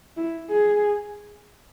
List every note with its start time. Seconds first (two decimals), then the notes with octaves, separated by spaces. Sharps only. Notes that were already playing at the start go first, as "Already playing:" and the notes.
0.17 E4
0.50 G#4